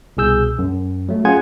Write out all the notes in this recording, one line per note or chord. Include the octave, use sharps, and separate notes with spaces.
C2 B2 G#4 E6 G6
F#2
F#3 A3
C#4 F4 G#4 F#5 G#5 G#6